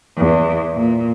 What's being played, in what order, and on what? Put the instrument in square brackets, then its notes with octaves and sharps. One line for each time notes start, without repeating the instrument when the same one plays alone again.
[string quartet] E2
A#2